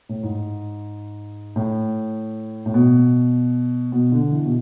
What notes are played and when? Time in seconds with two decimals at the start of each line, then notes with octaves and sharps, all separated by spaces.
0.09 A2
0.23 G#2
1.56 A2
2.66 A2
2.74 B2
3.92 B2
4.12 D3
4.31 E3
4.46 B2